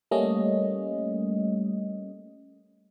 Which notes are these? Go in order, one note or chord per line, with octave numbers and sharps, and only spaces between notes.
G3 A3 A#3 C#4 D#5